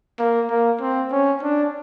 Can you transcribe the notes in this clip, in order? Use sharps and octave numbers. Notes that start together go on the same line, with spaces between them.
A#3
A#3
C4
C#4
D4